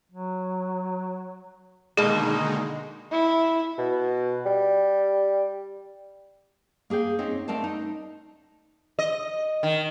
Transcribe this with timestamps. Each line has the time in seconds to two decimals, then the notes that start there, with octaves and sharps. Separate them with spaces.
0.12 F#3
1.97 B2 D3 D#3 G#3 A#3 D#4 G#4 D#5
3.12 E4
3.78 B2
4.46 G3
6.90 A#3 G#4 F5 G5
7.19 C4 C#4 D#4
7.48 A3 C4 A#4 D5 F5 A5
7.64 D#4
8.99 D#5
9.63 D#3